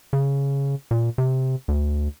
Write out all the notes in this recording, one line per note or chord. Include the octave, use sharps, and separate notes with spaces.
C#3
A#2
C3
D2